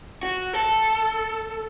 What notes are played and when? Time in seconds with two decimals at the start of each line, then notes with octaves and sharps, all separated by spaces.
0.23 F#4
0.53 A4